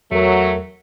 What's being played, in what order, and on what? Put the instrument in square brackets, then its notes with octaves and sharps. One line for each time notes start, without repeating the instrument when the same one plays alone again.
[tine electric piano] E2 A#4 [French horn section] F#3 [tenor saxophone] A3